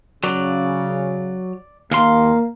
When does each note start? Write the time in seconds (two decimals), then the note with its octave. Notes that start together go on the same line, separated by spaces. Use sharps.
0.24 C#3 F#3 D5
1.91 D#2 A#3 F5 C6